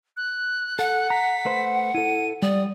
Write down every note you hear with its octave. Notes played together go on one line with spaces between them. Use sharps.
F#6
A4 F#5
A#5 B6
A3 B4 C5
E4 A4 D#7
G3 D5 D#6